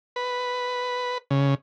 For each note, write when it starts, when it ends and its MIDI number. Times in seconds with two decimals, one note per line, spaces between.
0.16 1.18 71
1.31 1.55 49